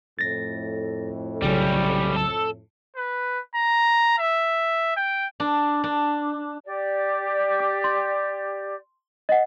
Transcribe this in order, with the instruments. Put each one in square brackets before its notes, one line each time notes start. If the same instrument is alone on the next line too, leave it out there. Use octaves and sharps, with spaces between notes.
[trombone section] F2 A2 [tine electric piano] A6 A#6
[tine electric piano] B1 C#3 F#3 [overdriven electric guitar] G3 C#4
[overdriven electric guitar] A4
[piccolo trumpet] B4
A#5
E5
G5
[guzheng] D4
D4
[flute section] G4 D5
[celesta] D6
C6
D#5 F#5